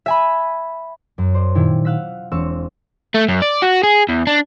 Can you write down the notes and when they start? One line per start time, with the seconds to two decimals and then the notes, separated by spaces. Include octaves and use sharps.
0.06 E5 G#5 B5
1.18 F#2
1.34 C5 D5
1.55 A#2 D#3 E4 F4 G4
1.85 F5 F#5 E6 B6
2.32 E1 C4 F5 C#6 E6
3.14 A3
3.28 F#2
3.42 D5
3.62 F#4
3.83 G#4
4.09 E2
4.27 D4